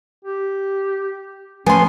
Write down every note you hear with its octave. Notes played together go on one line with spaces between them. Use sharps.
G4
F3 A3 B3 C#4 G#5 C6